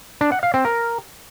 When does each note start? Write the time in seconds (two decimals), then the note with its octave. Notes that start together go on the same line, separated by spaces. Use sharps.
0.21 D4
0.32 F#5
0.43 F5
0.54 C4
0.65 A#4